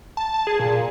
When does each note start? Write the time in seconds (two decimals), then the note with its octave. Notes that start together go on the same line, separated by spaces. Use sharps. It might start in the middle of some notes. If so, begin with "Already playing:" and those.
0.17 A5
0.34 A5
0.47 G#4
0.59 A#2